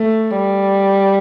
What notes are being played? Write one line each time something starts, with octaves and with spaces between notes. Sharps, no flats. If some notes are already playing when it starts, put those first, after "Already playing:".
Already playing: A3
G3